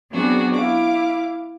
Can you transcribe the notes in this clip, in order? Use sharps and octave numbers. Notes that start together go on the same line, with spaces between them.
F#3 B3 C4 D4 F#4 G#4
E4 F5 D6